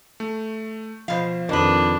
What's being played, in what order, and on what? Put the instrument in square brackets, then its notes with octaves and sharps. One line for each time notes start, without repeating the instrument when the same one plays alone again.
[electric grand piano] A3
[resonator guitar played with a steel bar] B2 F5 [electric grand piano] F3 C5
[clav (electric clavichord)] F2 D#3 [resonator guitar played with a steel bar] B2 B4 [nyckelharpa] D4